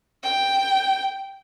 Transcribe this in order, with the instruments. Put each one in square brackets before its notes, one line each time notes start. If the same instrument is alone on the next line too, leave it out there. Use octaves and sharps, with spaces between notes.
[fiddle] G5